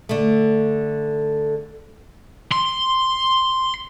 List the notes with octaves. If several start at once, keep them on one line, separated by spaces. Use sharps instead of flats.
D3 A3
C6